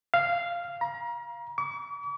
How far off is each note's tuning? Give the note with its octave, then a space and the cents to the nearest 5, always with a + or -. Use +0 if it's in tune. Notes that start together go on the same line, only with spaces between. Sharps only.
F5 -10
A#5 +35
D6 -45